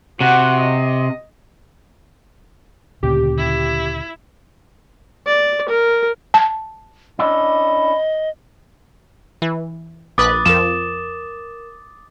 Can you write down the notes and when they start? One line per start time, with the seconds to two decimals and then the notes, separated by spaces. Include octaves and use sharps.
0.21 C3 F#4 F#5
0.61 D#5
3.03 D2 A#2 C#3 G4
3.38 E4
5.27 D5
5.69 A#4
6.34 A5
7.19 C#4 D4 E4 D#5
9.42 E3
10.18 A#1 B4 D6 D#6 F#6 A6
10.45 F2 F3 A#4 E7